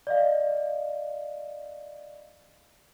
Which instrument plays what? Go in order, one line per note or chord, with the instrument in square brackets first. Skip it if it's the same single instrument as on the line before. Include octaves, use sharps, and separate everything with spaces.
[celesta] D5 D#5 F5